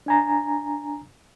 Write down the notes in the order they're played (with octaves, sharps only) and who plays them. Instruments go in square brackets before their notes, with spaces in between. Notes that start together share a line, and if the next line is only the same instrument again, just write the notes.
[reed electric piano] D4 G#5 A#5